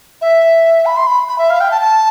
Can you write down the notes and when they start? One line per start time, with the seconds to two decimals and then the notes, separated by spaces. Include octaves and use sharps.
0.21 E5
0.86 B5
0.97 C6
1.07 B5
1.29 B5
1.38 E5
1.50 F5
1.61 G5
1.71 A5
1.81 A5